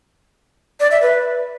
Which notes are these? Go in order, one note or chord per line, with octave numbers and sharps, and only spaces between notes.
D5
E5
B4